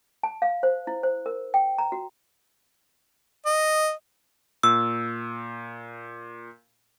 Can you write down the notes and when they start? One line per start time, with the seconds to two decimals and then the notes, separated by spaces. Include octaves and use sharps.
0.23 A5
0.42 F5
0.63 C5
0.87 E4
1.03 C5
1.26 A#4
1.54 G5
1.78 A#5
1.92 F#4
3.45 D#5
4.63 A#2 E6